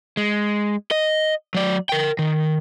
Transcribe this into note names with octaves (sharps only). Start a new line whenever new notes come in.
G#3
D#5
F#3 D5
A#4 G5
D#3